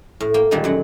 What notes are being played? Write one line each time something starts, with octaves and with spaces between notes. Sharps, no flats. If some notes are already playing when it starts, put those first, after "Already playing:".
A2
A#3 G5
A#2 D3 D#3 G3 G#3 A#3
F#2 F#3 F#5